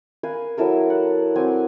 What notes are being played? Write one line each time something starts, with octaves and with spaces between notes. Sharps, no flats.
A#4 B4 F5 G#5
F#3 E4 A4 A#4
F#5
F#3 C4 G#5 D6